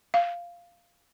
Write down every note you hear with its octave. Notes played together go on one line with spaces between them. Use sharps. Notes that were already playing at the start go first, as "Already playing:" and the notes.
F5